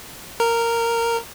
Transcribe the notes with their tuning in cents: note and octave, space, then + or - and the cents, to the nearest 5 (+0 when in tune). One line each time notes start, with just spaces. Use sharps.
A#4 -10